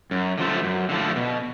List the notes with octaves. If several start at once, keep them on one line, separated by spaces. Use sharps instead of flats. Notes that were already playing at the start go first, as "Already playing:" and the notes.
F#2
D3 F3 A3
F#2
D3 F3 A3
B2